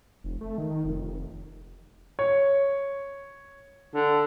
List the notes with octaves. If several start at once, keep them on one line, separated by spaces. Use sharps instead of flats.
F1
A3
D#3
F1
C#5
D3